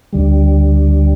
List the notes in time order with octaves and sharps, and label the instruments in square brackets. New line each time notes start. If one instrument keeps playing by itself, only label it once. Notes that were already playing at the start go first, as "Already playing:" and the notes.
[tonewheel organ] D2 D3 G3